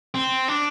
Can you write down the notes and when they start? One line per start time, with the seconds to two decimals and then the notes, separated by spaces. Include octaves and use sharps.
0.15 C4
0.48 D4